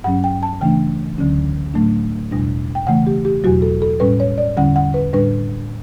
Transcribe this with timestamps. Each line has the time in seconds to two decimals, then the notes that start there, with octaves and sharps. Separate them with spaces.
0.04 G2 F#3 C#4 F#5
0.24 G5
0.43 A5
0.61 C#3 E3 A3 D4 G5
1.18 D2 D3 F#3 C#4
1.74 A2 F#3 A3 D4
2.31 E2 B2 G3 D4
2.75 G5
2.87 C#3 E3 A3 F#5
3.07 G4
3.25 G4
3.44 E2 B2 F#3 F#4
3.62 A4
3.82 A4
4.00 A2 G3 C#4 B4
4.20 C#5
4.38 D5
4.57 E2 D3 G3 C#4 F#5
4.76 F#5
4.94 B4
5.14 A2 G3 D4 B4